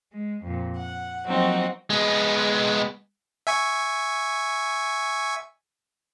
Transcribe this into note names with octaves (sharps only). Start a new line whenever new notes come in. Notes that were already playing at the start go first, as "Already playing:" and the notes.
G#3
F2 A#2
F#5
F3 F#3 A#3 C4 D#4 F#4
G#3 B3
E5 G#5 C#6